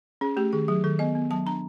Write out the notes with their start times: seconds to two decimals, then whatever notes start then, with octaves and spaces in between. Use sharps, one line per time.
0.21 C#4 G#4
0.37 A3 G4
0.53 D#3 G#4
0.68 F#3 G#4
0.84 D#3 A4
0.99 B3 D#5
1.15 B3
1.31 F#3 A5
1.46 D4 A#5